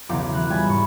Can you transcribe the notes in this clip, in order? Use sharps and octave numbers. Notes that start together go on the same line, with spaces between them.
B1 E2 C#3 C#4 F5 D6
E3 F#6
G3 F4 G#5 B5 A6
G#2 C#6